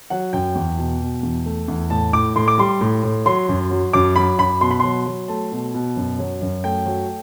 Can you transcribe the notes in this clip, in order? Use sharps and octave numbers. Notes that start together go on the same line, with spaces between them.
F#3 F#5
F#2 G5
E2
B2
B2
E2
A3
E2
A2 A5
A2 D6
A2 C6
D6
G3 C6
A2
A2
F#3 C6
F#2
F#3
F#2 D6
F#3 B5
F#2 B5
B2 C6
B5
F#3 C6
F#3
A3 A5
B2
B2
F#2
F#3
F#2
A3 G5
F#3